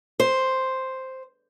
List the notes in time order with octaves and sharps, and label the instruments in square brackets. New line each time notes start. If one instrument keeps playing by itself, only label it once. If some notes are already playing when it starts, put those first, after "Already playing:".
[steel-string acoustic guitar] C5